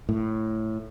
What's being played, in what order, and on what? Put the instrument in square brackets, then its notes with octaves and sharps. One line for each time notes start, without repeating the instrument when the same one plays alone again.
[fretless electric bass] A2